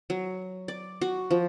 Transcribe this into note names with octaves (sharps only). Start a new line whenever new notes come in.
F#3
D5
F#4
F3